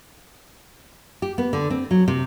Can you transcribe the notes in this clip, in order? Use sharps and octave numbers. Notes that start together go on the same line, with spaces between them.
G4
B3
D3
C4
F#3
C3